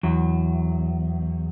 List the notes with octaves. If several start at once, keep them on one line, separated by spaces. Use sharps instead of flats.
E2 F#3